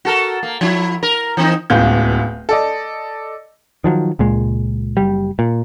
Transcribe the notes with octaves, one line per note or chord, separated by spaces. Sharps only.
F#4 A4 A#4
A#3
F3 E4
A#4
E3 C4 D#4
D1 C#2 B3 G6
A4 D5 D#5
D#3 F3 F#3
C#2 A#2 G#3
F#1 G3
A#2